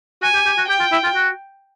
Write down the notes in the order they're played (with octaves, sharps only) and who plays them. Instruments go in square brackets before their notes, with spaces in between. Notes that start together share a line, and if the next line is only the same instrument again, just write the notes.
[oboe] F#4 [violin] G#5
[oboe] G4
G4
F#4
[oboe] G4 [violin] G5
[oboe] F4
E4
F4
F#4